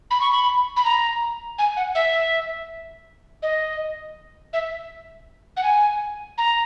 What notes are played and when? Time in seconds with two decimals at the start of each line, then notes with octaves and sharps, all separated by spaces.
0.11 B5
0.21 C#6
0.32 B5
0.77 B5
0.85 A#5
1.59 G#5
1.77 F#5
1.95 E5
3.43 D#5
4.53 E5
5.57 F#5
5.63 G#5
6.38 A#5